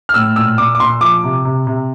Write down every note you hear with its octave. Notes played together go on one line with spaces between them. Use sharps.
F6
A2 E6
A#2 E6
A#2 D6
D6
A#2 C6
F3 D6
C3
C3
C3